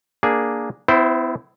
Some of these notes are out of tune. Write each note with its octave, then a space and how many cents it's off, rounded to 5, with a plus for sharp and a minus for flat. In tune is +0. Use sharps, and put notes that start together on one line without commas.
A#3 +0 D4 +0 G#4 +0
B3 +45 E4 +5 C5 +0